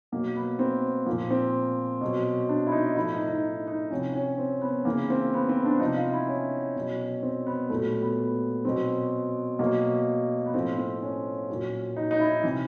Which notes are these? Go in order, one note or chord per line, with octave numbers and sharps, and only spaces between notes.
B2 F#3 A#3
B3
C4
A#2 F3 A#3
C4
B2 F#3
D4
E4
D#4
A2 F3 E4
D#4
D#4
D#4
C3 F3 C#4
C#4
C4
B3
C#3 E3 A#3
C4
B3
C4
D4
C3 F3 D#4
F4
E4
C#4
B2 F#3
C4
B3
A#2 F#3 A3
B3
B2 F#3 C4
B2 F#3 A#3
B3
A2 F3 C4
C4
C#4
A#2 F#3
D#4
D#4
E4
C3 E3